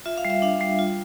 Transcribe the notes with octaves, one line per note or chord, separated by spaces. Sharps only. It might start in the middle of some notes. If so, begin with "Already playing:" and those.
F4 E5
F5
G3
E5
D4 F5
G3
F4